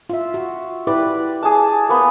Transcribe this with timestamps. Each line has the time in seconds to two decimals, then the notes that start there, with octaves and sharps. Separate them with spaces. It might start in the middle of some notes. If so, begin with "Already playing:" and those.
0.10 F4 E5
0.34 F#4
0.87 E4 G4 B4 D5
1.43 G#4 A5
1.89 A#3 B3